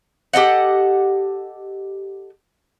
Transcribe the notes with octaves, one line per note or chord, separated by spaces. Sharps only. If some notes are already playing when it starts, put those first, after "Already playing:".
G4 A4 D#5 F#5